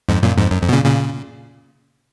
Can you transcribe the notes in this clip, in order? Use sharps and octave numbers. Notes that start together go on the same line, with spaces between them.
F2 G#2
F#2 A#2
F2 G#2
F#2
F2
B2
A#2 C#3
A#2 C#3